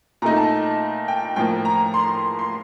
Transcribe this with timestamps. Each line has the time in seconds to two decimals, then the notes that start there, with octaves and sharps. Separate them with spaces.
0.22 A#2 A3 D#4 A#5
0.36 A5
1.08 G5
1.36 A2 F3 A#3 G5
1.65 A#5
1.94 C6
2.39 C6